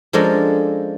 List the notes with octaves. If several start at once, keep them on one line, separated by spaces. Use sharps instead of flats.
F3 G#3 C#4 D4 A4 A#4